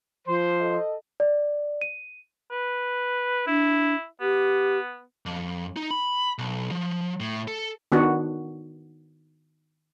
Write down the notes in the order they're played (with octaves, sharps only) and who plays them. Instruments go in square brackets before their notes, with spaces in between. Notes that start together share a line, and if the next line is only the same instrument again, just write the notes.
[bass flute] F3 [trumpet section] C5
[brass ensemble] A4 D#5
[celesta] D5
D#7
[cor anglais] B4
[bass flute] D4 [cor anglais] E4
[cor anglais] B3 [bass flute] G4
[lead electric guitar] F2
D#4
B5
B1
F3
A2
A4
[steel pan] D#3 B3 D4 F#4